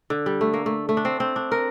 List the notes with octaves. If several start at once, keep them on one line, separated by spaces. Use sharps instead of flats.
D3
G3
A3
A#3
A3
A3
D4
C4
C4
D4
A#4